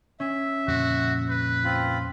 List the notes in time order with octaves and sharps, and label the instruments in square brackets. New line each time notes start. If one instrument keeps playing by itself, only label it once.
[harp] C#4 [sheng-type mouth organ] E5
[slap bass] F2 A#2 C#3 [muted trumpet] F#4
[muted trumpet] B4
[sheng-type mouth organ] C4 F4 B5